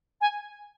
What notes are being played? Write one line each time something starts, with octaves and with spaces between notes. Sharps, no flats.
G#5